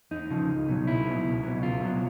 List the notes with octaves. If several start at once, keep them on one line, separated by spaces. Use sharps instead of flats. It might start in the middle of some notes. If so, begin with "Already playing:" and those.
E2 D#4
C#3 F3
C#2
B2 F#3
C#2 E4
B2 F#3
C#2
B2 F#3
C#2 F4
B2 F#3